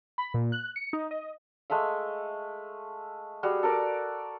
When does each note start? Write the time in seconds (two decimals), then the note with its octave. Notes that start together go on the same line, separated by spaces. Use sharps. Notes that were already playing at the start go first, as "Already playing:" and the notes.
0.18 B5
0.34 A#2
0.52 F#6
0.76 C#7
0.93 D#4
1.11 D#5
1.70 G#3 A3 E5 F5
3.43 G3 F#4 G#4
3.63 A4 A#4 D5 D6